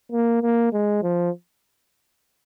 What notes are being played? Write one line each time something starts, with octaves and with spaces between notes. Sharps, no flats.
A#3
A#3
G#3
F3